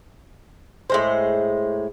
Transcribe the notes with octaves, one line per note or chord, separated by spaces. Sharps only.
A2 G#3 C5